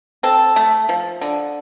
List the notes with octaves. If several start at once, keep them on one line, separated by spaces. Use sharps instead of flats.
C4 A4
A3
F3
D3